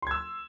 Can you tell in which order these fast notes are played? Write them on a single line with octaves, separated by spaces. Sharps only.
C6 G#6 E6